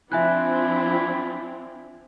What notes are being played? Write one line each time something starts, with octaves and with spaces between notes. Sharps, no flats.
F3 C4 D4 E4 E5 G#5 F#6